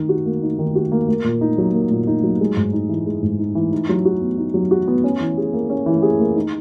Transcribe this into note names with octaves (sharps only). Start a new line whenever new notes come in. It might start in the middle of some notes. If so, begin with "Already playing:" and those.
Already playing: D#3 D#4
F#4
A#3
D#4
D#3
F#4
A#3
A#3
A#2
D#4
F#3
A#3
A#2
D#4
F#3
G#3
G#2
D#4
E3
G#3
G#2
D#4
E3
D#4
F#3
F#4
B3
D#4
F#3
F#4
B3
C#4
E3
G#4
A#3
C#4
E3
G#4
A#3
D#4